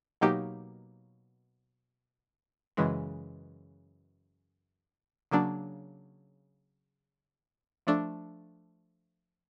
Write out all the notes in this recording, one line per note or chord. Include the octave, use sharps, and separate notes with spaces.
B2 F#3 A#3 D#4 G4
F#2 C#3 E3 G#3
C#3 F#3 A#3 D4
F3 A3 D4